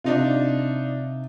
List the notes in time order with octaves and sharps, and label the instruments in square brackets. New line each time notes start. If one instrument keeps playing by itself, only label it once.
[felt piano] C3 [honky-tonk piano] D4 D#4 F4